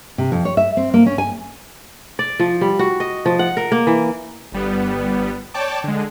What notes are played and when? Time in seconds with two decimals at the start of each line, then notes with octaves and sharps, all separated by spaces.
0.18 C3
0.32 F2
0.45 C#5
0.57 E5
0.77 C4
0.94 A#3
1.06 C#4
1.18 G#5
2.19 D5
2.39 F3
2.61 G3
2.79 F#4
3.00 D#5
3.26 F3
3.39 F#5
3.57 A#4
3.72 A#3
3.87 E3
4.52 G1 G3 B3
5.54 C#5 D5 G5 A5 D6
5.84 D3 G#3